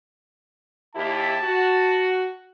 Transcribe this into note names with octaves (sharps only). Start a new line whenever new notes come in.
D#2 E4 G4 A5
F#4